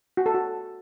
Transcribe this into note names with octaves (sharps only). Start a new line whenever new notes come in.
F#4
A4
F#4